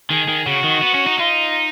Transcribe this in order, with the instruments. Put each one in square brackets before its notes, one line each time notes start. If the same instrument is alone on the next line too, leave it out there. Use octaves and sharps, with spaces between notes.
[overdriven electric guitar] D#3 [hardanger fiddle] G#4
[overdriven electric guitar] D#3
[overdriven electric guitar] C#3 [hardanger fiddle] F#4
[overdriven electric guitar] D#3
B3
C#4
D#4
[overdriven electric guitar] D#4 [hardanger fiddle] F4